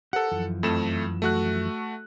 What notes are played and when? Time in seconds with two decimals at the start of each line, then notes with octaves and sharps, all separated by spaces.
0.13 G4 A4 A#4 C5 F#5
0.32 F#2 E3 F3
0.63 F2 A3 E7
1.22 A3 F#4 F#6